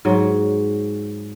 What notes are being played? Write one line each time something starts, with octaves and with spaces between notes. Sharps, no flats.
G#2 F#3